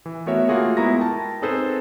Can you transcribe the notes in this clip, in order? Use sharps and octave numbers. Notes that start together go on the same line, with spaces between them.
E3
A3 B3 F#4 A#4 C#5 E5
A3 A#3 F4 F#4 G#4
G#3 B3 E4 A#5 C#6 A#6
A#4 G5 A5
C4 D#4 G#4 A4 B4 C5